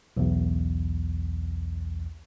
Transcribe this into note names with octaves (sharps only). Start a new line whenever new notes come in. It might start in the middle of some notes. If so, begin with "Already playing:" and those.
B1 E2